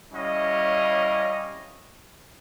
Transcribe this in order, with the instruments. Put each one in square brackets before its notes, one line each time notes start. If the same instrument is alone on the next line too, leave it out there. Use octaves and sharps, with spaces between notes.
[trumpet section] G3 C#4 E4 C#5 D#5 F5